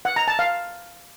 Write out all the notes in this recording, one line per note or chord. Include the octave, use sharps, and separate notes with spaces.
F#5
A#5
A5
F5